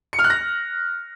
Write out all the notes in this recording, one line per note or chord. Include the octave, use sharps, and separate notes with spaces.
C#7
F6
F#6
A#6